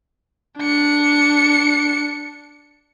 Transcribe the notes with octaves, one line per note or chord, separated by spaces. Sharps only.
D4 C#7